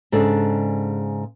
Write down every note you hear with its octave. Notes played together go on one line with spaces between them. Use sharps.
G#2 C#3 D4 G#4 A4